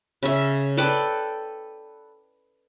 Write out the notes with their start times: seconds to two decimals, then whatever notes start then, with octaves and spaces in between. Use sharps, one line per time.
0.23 C#3 E5
0.77 A4 B4 D5 G5